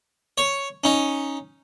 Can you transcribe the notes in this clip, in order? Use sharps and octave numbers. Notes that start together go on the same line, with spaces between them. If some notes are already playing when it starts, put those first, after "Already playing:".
C#5
C#4 D#4